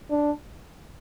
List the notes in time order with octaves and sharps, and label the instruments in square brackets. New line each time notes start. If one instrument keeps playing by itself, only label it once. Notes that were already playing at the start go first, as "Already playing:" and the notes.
[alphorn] D4